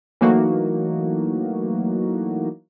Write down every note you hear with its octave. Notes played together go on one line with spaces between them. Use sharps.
E3 F#3 A3 A#3 D#4 F#4